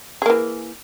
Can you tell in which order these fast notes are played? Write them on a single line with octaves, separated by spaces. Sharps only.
G#4 A#3 E3